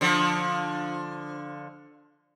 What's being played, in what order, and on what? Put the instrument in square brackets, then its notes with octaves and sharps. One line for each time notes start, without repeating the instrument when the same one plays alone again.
[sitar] D3 F3